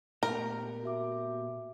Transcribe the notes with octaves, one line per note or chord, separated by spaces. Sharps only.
A#2 A3 B3 G4 A#4
F#4 E5 D6